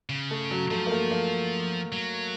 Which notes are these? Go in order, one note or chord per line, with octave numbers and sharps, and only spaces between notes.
C#3
A3
F#3
F3 A3
A#3
A3
A#3
F#3